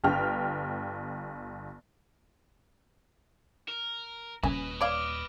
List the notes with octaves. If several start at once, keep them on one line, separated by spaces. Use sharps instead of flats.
G1 G5 F6
A#4
D#1 G#1 C#4 B4 D#5 G#5
C#5 D5 F5 D6 F6 D7